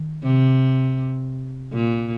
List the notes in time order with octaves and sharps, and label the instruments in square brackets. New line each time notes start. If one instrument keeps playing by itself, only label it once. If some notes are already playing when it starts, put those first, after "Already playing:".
Already playing: [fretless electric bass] D#3
[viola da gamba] C3
A#2